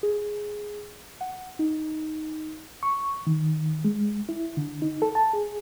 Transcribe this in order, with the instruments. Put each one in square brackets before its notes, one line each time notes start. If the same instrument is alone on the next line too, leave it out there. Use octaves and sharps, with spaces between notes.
[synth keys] G#4
F#5
D#4
[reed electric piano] C#6
D#3
G#3
E4
D3
D#4
A4
A5
G#4